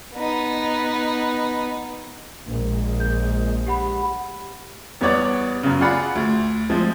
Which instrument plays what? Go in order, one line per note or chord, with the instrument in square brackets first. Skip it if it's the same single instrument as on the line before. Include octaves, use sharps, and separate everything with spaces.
[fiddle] B3 D#4
[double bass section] A#1 A#2 G#3
[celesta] G6
G4 F#5 B5
[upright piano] E2 G3 B3 C#5 D5 F#5
F#2 C#3
F4 G#4 D5 F#5 B5
D2
D2 F3 G#3 C4